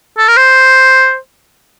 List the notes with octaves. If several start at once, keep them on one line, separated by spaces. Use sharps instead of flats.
A4
A#4
C5